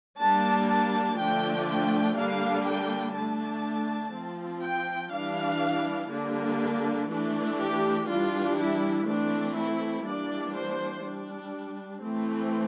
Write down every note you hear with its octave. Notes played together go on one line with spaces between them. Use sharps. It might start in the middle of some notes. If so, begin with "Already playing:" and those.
G3 A#3 D4 A5
A5
D3 F3 A3 D4 G5
G5
D3 G3 A#3 D4 F5
G5
D3 A3 D4 A5
F3 C4
G5
E3 G3 D4 F5
D3 G3 A#3 D4
E3 A3 D4
G4
E3 G3 D4 F4
E4
E3 A3 C4 D4
E4
E3 G3 A#3 D4 D5
C5
G3 D4
E3 A3 C4